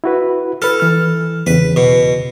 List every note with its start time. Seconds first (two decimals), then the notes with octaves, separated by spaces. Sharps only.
0.04 E4 F#4 B4
0.62 A4 B4 F6
0.80 E3 F6
1.47 E2 C#3 B4
1.76 B2